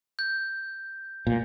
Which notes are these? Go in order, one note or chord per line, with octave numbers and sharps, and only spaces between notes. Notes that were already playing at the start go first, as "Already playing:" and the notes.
G6
A#2